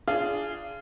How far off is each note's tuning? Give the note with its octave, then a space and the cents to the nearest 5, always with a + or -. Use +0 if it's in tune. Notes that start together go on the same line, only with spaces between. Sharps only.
D4 +0 F4 -25 G#4 +0